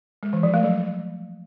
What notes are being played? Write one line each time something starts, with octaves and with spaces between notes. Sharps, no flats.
G#3
E3
F3
A3
F#3